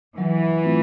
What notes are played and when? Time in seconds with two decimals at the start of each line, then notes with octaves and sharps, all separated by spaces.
0.17 E3 F#3
0.64 A3 C4 F4